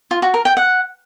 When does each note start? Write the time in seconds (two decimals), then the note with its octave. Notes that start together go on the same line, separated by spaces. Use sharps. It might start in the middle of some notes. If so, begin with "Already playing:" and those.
0.11 F4
0.22 F#4
0.34 A#4
0.45 G5
0.57 F#5